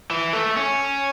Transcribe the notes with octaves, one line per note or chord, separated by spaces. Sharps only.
E3
A3
C#4